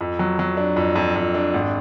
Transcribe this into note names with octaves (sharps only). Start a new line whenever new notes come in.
F2
F#3
F#3
D4
F2
F2
F2
D4
G#1